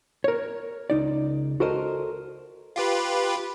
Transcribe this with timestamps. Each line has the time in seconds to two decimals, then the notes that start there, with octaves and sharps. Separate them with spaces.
0.24 A#4 C#5
0.90 C#2 D#4 D5
1.60 F#4 A4 A#4 C5 D#5
2.76 F4 G4 B4